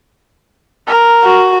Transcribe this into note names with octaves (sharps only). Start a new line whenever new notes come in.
A#4
F#4